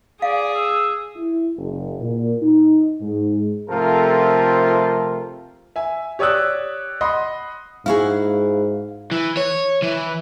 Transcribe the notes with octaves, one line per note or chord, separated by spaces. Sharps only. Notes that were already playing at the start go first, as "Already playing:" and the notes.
G#4 D5 F5
E6
E4
F#1
A#2
D#4
G#2
C3 F3 A3 F4 A4 A#4
E5 G#5
G4 C#5 D5 D#6 E6 F#6
D#5 F#5 B5 C6 D#6
G#2 E4 F#4 G#4 F5
E3
C#5
E3